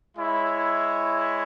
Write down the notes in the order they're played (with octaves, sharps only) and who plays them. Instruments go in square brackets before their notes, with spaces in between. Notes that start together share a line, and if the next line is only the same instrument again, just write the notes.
[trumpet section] G#3 E4 C#5